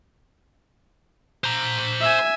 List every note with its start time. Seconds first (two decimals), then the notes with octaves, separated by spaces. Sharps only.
1.44 C5 A#5
2.01 E5 G#5